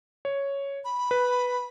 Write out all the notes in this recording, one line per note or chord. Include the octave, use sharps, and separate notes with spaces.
C#5
B5
B4